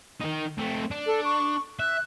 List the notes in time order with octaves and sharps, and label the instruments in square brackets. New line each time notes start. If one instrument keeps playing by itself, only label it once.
[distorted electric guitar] D#3 D#4
A3 C4
D4
[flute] A4
C#6
[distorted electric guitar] E5 [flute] F#6